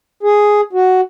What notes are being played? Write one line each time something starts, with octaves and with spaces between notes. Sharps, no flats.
G#4
F#4